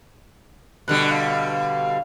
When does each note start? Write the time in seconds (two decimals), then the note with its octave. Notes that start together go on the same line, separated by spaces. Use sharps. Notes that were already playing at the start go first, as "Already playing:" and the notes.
0.88 B2 D3 G3 F#6
1.11 F5